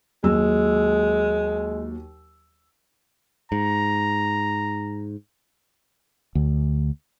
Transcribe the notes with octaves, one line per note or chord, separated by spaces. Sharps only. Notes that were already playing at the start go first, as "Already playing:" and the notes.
D#2 F#3 G#3 E6
G#2 A#5
D2